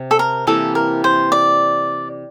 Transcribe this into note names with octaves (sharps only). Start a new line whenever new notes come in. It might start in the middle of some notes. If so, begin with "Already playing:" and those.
Already playing: C3
A4
A#4
C3 E3 A#3 A4
A#4
C5
D5